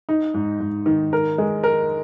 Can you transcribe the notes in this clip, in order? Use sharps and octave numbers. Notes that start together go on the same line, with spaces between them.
D#4
G#2
G#2
D#3
A#4
G#3
A#4